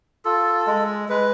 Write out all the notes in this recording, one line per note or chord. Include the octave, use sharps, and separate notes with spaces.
F4 A4
G#3
G#3 B4